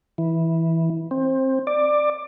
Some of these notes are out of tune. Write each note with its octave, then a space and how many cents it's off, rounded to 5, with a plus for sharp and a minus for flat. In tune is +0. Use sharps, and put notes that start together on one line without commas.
E3 -10
C4 +20
D5 +15